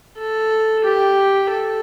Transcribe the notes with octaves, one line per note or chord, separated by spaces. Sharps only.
A4
G4
A4